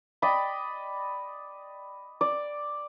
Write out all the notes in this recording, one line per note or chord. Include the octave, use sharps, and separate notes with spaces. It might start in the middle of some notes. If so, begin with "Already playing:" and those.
D5 D#5 G5 B5
D5